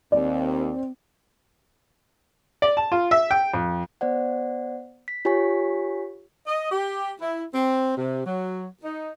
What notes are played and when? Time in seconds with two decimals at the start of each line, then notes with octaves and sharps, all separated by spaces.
0.12 D#2 C4 D5
2.62 D5
2.77 A5
2.92 F4
3.11 E5
3.31 G5
3.54 F2
4.01 B3 C5 D5 F#5
5.08 B6
5.25 F4 G4 C#5 G#5 C#6 B6
6.47 D#5
6.71 G4
7.21 E4
7.54 C4
7.97 C3
8.26 F#3
8.83 D#4